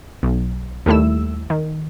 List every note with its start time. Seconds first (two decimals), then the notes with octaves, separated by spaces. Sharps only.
0.23 B1
0.86 D#2 G3 A3 E4 E6
1.50 D#3